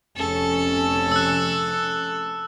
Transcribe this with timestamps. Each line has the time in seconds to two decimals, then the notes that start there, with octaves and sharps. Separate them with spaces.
0.17 F1 C#4 A4
1.12 E6 F#6